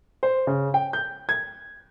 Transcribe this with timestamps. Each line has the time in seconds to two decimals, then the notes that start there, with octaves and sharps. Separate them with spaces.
0.23 C5
0.47 C#3
0.74 G5
0.93 G6
1.29 G#6